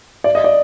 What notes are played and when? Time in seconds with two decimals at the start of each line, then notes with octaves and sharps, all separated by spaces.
0.24 D5
0.35 D#5
0.44 D5